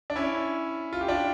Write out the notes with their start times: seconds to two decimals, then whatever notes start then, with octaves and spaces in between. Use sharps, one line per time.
0.10 D4
0.16 C#4 E4
0.93 F4
1.01 G4
1.08 D4 F4